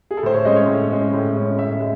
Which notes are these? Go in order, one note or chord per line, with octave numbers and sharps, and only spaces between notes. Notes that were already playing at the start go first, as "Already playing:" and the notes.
G#4
A4
A2 C5
C#5
G#3 C#4 D#5
C#5
A2
G#3 C#4
A2
G#3 C#4
A2 E5
E5
G#3